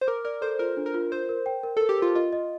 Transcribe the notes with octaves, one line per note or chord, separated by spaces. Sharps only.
C5
A#4 D6
A#4 D5
A4 C5
F4 A#4
D4
A#4
F4
A#4 C5
A#4
G5
A#4
A4
A#4
G4
F4 A#4
F4 D#5
D#5